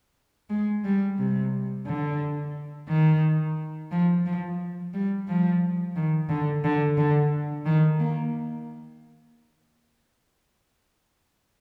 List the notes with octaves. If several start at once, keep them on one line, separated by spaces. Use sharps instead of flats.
G#3
G3
C3
D3
D#3
F3
F3
G3
F3
D#3
D3
D3
D3
D#3
A#3